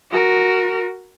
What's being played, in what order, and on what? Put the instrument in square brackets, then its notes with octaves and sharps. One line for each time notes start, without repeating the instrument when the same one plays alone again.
[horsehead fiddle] F#4 A#4